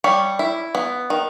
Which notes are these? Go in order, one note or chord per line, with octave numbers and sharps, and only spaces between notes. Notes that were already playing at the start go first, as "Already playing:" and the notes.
G3 C#5
E4
B3
D#3